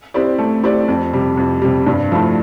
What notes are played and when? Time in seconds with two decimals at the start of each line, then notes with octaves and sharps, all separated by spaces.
0.14 C4 E4 G4 D5
0.38 A3
0.64 C4 E4 G4 D5
0.88 F2
1.13 C3 G3
1.37 F2
1.62 C3 G3
1.86 G2
2.12 F3 A3 E4